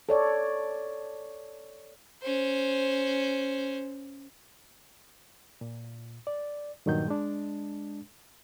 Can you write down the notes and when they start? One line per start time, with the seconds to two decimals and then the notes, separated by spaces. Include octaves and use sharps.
0.09 A4 C#5 D5
2.23 C#4 C5
5.61 A#2
6.27 D5
6.86 G2 A#2 D#3 F#3 G6
7.08 G#3 D4